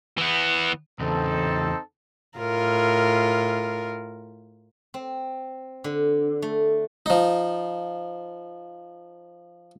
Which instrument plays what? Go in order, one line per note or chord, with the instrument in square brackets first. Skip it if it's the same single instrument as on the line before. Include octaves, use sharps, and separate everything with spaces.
[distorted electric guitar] E3 B3
[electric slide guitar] E2 C#3 [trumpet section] C4 D#4 A4
[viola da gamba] A2 F4 A#4
[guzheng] C4
D3
A3
[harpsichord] F3 D#4